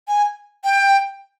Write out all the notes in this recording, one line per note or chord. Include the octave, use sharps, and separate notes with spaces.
G#5
G5